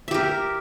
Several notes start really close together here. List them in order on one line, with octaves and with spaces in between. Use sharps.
E5 G4 A#4